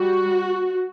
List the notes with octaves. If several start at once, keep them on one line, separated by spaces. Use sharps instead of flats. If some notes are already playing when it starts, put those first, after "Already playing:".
Already playing: G3 F#4